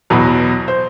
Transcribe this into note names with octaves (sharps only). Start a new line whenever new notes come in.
E2 B2 F#3 B4
C5